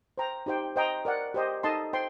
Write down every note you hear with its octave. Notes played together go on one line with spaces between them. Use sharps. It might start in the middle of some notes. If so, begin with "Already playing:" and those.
C5 G5 A#5
D#4 G4 C5 G5
C5 D#5 G5 A#5
A#4 D5 F#5
G4 C5 D#5
D#4 A4 D#5 A5 C6
C5 G5 C6